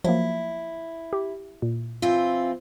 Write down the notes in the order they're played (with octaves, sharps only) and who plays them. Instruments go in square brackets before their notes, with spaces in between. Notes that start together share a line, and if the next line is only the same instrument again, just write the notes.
[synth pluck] F3 F#3 A#3 [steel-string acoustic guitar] E4
[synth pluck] G4
A#2
[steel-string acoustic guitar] E3 C4 F4